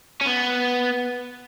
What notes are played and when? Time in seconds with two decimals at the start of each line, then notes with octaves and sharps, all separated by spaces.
0.21 C#4
0.26 B3